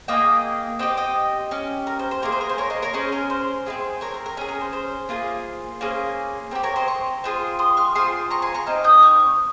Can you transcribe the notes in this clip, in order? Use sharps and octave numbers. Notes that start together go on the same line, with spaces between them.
A#3 F4 G#4 D#5 G5
C4 G4 D#5 G5
D#5 G5
C#4 G4
A#4
C5
C5
A#3 D#4 G#4 A#4
C5
A#4
C5
A#4 C#5
C5 D#5
A#4 C#5
C#4 G#4 C5
A#4
C5
C4 F4 G#4
A#4 C#5
A#4
A#4
C#4 G#4 A#4
A#4
C5
C5
A#3 F4 G#4
A#3 C#4 G#4 C5
C4 G4 A#4
A#4 C#5
C5 D#5
A#5 C#6
C4 F4 G#4
C6 D#6
C#6 F6
C4 F4 G#4 C6 D#6
A#5 C#6
G#5 C6
A#5 C#6
C4 D#4 F6
D#6 G6
C#6 F6